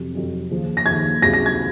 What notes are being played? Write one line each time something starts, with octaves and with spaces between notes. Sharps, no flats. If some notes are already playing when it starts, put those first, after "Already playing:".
Already playing: F2 C3 F#3
F2 C3 F#3
D#2 C#3 F3
A#6
D#2 C#3 F3 G#6
C#2 C3 F#3 A#6
A#6
G#6